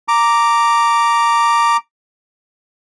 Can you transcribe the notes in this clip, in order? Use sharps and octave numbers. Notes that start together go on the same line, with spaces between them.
A#5 D6